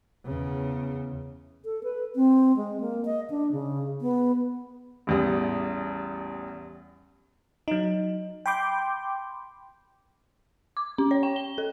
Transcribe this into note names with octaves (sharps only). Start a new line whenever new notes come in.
E2 C#3
A4
B4
C4
G#3
A#3
D#5
D4
C#3
B3
A1 E2 G3
F#3 D#4
G5 B5 C6 D6 G6
D6
C#4
C#5
G5
G7
A4